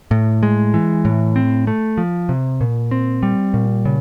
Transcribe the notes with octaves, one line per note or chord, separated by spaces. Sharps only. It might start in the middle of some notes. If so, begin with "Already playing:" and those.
A2
G#3
E3
A2
C4
A3
F3
C3
A#2
C4
G3
A#2
C#3